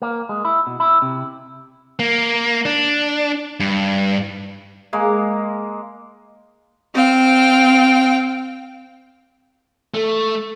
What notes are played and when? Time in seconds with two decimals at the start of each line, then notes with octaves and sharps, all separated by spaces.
0.02 A#3
0.29 G#3
0.45 E4
0.67 B2
0.80 E4
1.02 C3
1.99 A#3
2.65 D4
3.60 G2
4.93 G#3 A#3
6.93 C4 F5 G5
9.94 A3